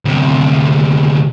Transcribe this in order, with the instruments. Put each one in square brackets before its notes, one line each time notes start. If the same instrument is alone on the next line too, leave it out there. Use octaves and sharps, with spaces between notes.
[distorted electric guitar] D2 C3